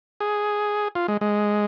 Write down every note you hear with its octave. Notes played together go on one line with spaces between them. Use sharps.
G#4
F4
G#3
G#3